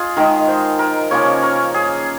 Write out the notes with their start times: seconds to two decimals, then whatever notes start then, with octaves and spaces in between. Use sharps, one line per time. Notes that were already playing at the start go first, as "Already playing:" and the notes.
Already playing: F4 G#4 D#5
0.17 D#3 G#3 D#4 A#4
0.48 C5
0.79 A#4
1.11 C#3 F3 A#3 C#4 C#5
1.43 A#4
1.74 G#4